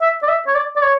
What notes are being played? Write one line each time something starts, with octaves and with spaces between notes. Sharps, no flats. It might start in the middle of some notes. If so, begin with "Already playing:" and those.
E5
D5
E5
C#5
D5
D5
C#5